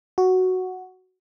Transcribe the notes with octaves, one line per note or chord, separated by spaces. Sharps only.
F#4